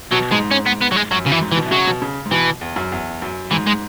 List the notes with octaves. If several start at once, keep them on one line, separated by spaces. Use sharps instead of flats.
B2 F#3
G#2 G#3
C#4
B3
B3
F#3
G#3
F#2 F#3
F#2 C#3
E3
G#2
E3
B2
E3
C#3 F#3
B2
C#3
G#2
B2 E3
E2
F#2
E2
F#2
G#2 E3
G#3